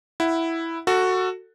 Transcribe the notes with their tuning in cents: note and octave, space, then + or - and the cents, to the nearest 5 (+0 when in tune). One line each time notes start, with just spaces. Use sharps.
E4 +0 F#5 +0
F#4 +0 A4 +25